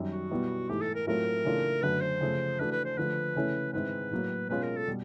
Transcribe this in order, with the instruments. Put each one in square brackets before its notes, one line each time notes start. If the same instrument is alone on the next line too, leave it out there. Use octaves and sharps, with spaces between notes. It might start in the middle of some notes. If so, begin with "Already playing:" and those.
Already playing: [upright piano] F#2 D#3 G3
[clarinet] F#4
[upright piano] B2 G3 B3 E4
[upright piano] G#2 E3 A3 [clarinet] G4
[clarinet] A4
A#4
[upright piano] A2 F#3 A3 C4 F4 [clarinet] A#4
[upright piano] C#3 E3 A3 D4 F4
[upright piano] F#2 D3 F#3 A3 [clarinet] B4
[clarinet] C5
[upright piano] C#3 F3 A3
[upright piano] E3 A3 D4 F#4 [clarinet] B4
[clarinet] B4
C5
[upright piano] D3 F3 A3 [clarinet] B4
[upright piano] C#3 E3 A3 C#4 E4
[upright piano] G#2 D#3 G#3 C4 E4 [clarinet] B4
[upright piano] A2 F#3 A#3
[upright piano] B2 G#3 C#4 F4 [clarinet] B4
[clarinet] A#4
A4
[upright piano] B2 G3